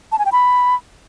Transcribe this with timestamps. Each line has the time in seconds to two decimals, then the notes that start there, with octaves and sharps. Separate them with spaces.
0.12 A5
0.19 G#5
0.26 G5
0.32 B5